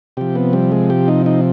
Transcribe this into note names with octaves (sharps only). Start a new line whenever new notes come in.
C3 F3 G4
B3
G3
G#3
G4
D#4
D#4